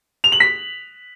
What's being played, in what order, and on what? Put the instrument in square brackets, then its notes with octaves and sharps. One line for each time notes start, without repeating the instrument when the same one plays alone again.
[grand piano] F7
F#7
B6